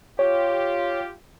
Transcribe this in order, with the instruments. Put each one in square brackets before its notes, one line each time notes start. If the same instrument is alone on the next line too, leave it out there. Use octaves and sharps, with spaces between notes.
[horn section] F4 G4 [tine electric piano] C#5